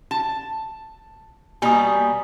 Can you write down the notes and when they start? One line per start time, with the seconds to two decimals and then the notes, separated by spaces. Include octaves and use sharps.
0.11 A5
1.62 B2 G3 A#3 G#5 A#5 D#6